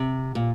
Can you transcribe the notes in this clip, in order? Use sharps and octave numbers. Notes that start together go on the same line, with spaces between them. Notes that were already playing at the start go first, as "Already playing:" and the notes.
Already playing: C3
A#2